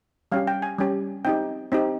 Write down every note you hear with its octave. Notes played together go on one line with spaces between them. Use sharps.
G3 C#4 G4 F5
G5
G#5
G3 C#4 G4
C4 D#4 G4 G5
C4 D#4 G4